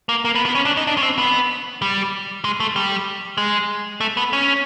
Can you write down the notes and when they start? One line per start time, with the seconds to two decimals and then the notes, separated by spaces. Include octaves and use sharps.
0.09 A#3
0.25 A#3
0.35 B3
0.46 B3
0.55 C#4
0.66 D4
0.77 D#4
0.87 D4
0.98 C#4
1.03 C4
1.18 B3
1.82 G3
2.45 G#3
2.60 A3
2.76 G3
3.38 G#3
4.01 A3
4.17 B3
4.33 C#4